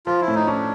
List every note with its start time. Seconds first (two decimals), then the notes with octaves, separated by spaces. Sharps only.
0.06 F3 F4
0.21 E4
0.28 A2
0.35 D#4
0.47 C#4 D4